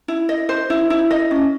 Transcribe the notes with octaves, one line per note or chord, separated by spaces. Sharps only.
E4
D#5
C5
E4
E4
D#5
C#4